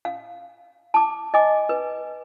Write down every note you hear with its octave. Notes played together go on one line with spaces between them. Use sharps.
F5
A5 D6
D#5 G#5 D6
B4